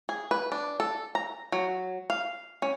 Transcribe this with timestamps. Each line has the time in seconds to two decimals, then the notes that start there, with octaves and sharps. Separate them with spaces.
0.09 G#4
0.31 B4
0.52 D4
0.80 A4
1.15 A#5
1.52 F#3
2.10 F5
2.62 C#4